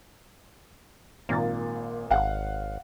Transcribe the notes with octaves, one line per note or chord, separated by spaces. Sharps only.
G#1 A#2 A#3 A6
G#1 F5 F#5